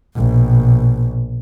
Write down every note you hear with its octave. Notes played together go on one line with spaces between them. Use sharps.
A#1 B2